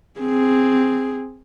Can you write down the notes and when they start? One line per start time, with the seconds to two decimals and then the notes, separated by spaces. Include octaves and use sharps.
0.20 C4 G#4